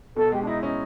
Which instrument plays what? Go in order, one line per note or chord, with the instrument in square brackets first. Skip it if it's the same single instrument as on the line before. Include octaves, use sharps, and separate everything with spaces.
[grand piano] B2 [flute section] A4
[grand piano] G#3 [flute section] G4
[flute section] D4
[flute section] D#4 [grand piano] E4
[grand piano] C#4 [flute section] D#4